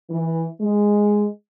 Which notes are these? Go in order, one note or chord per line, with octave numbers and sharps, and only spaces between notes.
E3
G#3